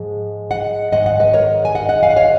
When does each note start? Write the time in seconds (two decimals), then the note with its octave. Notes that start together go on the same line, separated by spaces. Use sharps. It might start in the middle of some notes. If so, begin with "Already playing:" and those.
Already playing: G#2 F3 G#3
0.51 D#5 F#5
0.92 G#2 D#3 G#3 D#5 F#5
1.06 D#5 F#5
1.20 B4 D#5
1.34 A#4 C#5
1.65 G#5
1.75 D#5 F#5
1.89 D#5 F#5
2.03 F5 G#5
2.10 F#5
2.16 C#5 F5